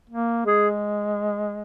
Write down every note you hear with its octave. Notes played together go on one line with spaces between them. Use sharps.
A#3
G#3 G#4